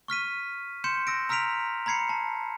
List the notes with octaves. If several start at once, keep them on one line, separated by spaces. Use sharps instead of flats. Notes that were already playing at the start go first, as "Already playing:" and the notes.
C#6 F6 B6 D#7
C6 G6 C#7 E7
E6 A#6 D7
A#5 E6 F6 B6 D7 F7
A#5 B5 G#6 C7 C#7
A5